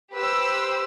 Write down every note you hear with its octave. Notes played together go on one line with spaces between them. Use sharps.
G4 B4 C5 E6